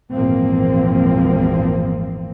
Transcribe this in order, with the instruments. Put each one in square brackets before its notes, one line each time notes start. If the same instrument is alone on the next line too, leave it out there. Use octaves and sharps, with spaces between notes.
[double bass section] G#1 E2 A#2 F3 A#3 C4